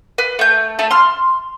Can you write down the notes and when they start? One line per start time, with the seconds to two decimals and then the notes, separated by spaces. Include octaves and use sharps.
0.18 B4
0.39 A3 G6
0.79 A3 A4
0.91 C6 F6